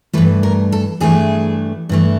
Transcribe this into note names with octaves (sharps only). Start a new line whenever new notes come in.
G2 E3 A3 B4
A#4
A4
G2 E3 A3 G#4
G2 E3 A3